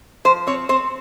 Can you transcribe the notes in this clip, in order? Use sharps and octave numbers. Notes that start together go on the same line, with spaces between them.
F3 C5
C4 C#5
C4 C5